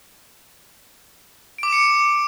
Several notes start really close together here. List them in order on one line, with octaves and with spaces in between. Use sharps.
D7 D6 E7 C#7